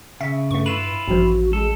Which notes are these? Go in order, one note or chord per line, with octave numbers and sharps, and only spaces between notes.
C#3 E5
G2 A3 C#6
E4 F4 B4 E7
A1 G2 F3 F#4
G#3 A4